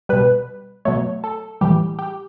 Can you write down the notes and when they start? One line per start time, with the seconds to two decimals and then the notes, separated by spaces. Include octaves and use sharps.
0.09 B2 G3 B4
0.85 B2 F#3 A3 C#5
1.24 A4
1.61 A2 E3 G3 G4
1.99 G4